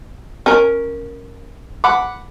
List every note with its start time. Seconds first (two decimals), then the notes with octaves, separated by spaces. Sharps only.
0.46 C#4 A#4
1.84 F#5 B5 D6